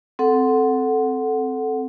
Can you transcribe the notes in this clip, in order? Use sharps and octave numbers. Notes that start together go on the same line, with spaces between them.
C4 A4 F#5